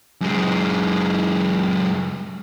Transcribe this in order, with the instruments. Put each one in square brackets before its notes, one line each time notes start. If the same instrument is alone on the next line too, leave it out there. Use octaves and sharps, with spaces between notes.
[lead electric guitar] F#2 G#3